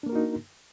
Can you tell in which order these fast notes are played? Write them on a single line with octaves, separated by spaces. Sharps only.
D4 A#3 A#4 F#4 D#4